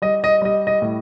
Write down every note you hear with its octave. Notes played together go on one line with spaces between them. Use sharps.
G3 D#5
D#5
G3 D#5
D#5
A2